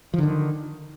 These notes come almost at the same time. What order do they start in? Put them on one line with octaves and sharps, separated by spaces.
F3 D3 D#3